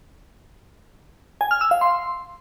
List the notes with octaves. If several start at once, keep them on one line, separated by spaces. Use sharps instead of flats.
G#5
F6
E6
F5
C6